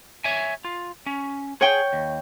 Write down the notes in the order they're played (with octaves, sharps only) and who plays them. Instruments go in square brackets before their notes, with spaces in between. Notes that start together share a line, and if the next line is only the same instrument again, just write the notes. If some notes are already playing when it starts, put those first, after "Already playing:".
[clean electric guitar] C#5 E5 G#5
F4
C#4
[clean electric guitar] G#4 [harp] C#5 G5
[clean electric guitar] D#2